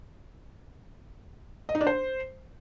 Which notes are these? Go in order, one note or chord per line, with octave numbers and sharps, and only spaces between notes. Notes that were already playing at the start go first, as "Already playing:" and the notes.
D#5
D#4
D4
C5